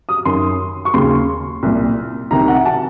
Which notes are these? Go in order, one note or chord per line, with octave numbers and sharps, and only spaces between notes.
D#6
F#2 D#3 C6
C#6
D#2 C#3 C6
C2 A#2
C2 C3 D#3 A#5
F#5
A5